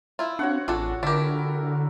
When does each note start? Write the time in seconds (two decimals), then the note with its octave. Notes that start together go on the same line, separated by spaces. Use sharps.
0.19 E4 F4
0.39 C4 D4 F#4 C#5 F#5
0.68 A1 D4 F4 G#4 A4
1.03 D3 D4 E4 G4 A#4